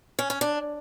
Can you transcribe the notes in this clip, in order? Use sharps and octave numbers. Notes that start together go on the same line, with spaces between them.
C#4
C#4
D4